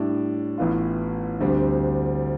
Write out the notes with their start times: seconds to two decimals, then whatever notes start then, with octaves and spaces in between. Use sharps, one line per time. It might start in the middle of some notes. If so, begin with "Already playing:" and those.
Already playing: A2 G3 D4
0.58 A1 A2 E3 B3 F4
1.40 D2 D3 G3 C4